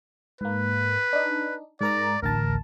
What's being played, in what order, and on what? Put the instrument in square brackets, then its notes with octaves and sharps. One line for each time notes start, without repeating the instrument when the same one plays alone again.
[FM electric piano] G#2 A#3 [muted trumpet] B4
[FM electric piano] D4 D#4
[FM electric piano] G#2 A#4 A#5 [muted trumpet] D5
[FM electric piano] A1 D2 A5 [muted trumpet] A#4